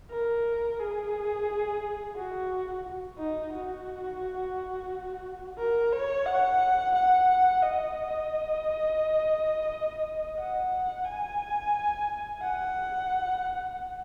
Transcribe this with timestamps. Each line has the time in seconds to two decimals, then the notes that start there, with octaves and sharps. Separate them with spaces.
0.11 A#4
0.79 G#4
2.16 F#4
3.18 D#4
3.53 F#4
5.58 A#4
5.92 C#5
6.26 F#5
6.95 F#5
7.63 D#5
10.37 F#5
11.05 G#5
12.42 F#5